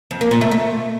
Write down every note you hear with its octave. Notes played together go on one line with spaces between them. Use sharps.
F2
A#3
A#2
A3
A3